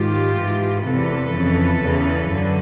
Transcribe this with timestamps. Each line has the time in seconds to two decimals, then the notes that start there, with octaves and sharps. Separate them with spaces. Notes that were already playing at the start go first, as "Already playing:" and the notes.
Already playing: G#2 D#3 F4 G4
0.37 G#2 E3
0.84 E2 C3 E3 A4 B4
1.32 F2 C#3 E3
1.81 E2 C#3 E3
2.28 F#2 D3